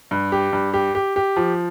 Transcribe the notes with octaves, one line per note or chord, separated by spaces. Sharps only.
G2
G4
G2
G4
G4
G4
F3